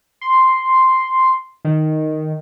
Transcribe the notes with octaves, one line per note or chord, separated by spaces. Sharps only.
C6
D#3